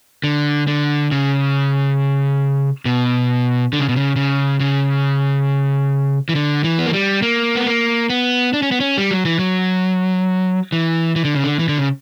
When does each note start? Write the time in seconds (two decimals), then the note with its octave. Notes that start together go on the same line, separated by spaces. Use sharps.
0.24 D3
0.67 D3
1.12 C#3
2.85 B2
3.73 D3
3.80 C#3
3.89 B2
3.96 C#3
4.16 C#3
4.60 C#3
6.29 E3
6.35 D3
6.64 E3
6.78 B3
6.86 A#3
6.93 G3
7.22 A#3
7.55 B3
7.66 A#3
8.10 B3
8.53 D4
8.62 C#4
8.71 B3
8.80 C#4
8.97 G3
9.11 F#3
9.25 E3
9.39 F#3
10.72 E3
11.16 E3
11.25 D3
11.35 C#3
11.44 D3
11.59 E3
11.68 D3
11.78 C#3